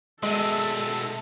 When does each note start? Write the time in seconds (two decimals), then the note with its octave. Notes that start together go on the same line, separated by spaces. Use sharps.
0.23 B2 D#3 G#3 A4 E5